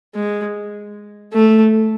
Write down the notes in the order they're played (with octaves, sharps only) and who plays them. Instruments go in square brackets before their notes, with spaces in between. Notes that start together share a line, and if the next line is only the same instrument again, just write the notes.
[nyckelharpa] G#3
A3